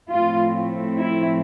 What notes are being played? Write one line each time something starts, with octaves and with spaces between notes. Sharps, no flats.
A2 F3 A3 C4 F4
E4